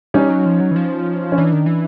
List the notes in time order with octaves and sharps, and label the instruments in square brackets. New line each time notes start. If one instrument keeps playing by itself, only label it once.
[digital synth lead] G3 [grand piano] C#4 D#4
[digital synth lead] F#3
F3
F#3
E3
F3
[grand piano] C#4
[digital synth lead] E3 [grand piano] D4
[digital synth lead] D#3
E3